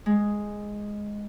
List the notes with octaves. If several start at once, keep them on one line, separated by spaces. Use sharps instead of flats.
G#3